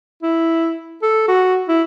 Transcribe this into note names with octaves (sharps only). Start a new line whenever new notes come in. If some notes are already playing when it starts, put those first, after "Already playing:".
E4
A4
F#4
E4